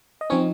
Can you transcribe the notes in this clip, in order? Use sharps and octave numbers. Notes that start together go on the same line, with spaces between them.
D#5
F3 C4 C#4 D#4 C#5